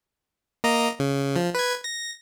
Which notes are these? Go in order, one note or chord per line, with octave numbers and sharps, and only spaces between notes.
A#3 D#5 A#5
C#3
F3
B4 G#6
A#6